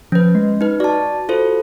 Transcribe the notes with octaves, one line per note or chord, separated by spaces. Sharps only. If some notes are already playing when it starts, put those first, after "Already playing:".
F3 C#4 B4
G#3
D#4 B4
F#4 D5 A5
F4 A4 C5